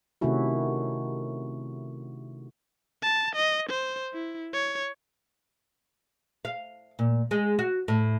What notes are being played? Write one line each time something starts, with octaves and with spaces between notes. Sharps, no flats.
C3 D#3 A3 C#4 E4 F#4
A5
D#5
C5
E4
C#5
F5
A#2
G#3
F#4
A2